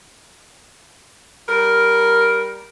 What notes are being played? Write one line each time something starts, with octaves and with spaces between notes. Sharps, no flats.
G3 A#4